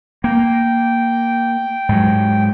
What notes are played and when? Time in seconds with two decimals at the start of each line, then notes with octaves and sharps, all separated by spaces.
0.24 A#3 G5
1.89 G#2 F#3